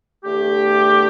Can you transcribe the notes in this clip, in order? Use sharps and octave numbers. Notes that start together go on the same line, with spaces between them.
E2 D3 A3 G4